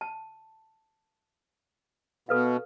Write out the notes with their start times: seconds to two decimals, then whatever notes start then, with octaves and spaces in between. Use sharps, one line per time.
0.01 A5
2.29 B2 A4 B4 F5